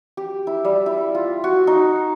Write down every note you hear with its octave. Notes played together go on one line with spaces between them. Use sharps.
G4
E4
G3
E4
F4
F#4
D#4